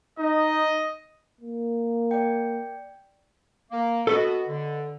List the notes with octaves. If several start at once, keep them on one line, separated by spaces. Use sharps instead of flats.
D#4 D#5
A#3
D5 G5
A#3
B3 F#4 A4 B4 D#5
D3